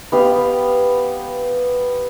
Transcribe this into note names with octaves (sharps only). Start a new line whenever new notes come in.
B3 G4 F5